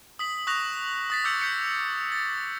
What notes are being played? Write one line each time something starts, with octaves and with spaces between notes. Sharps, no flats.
D#6 B6 F#7
C#6 D#6 F#6 A#6 F7
D#6 A6 B6
D6 E6 G6 C#7
G6 B6 C#7
A6